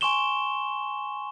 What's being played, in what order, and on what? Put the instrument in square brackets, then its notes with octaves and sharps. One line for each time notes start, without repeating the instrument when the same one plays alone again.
[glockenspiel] G#5 C6 C#6 E7 G7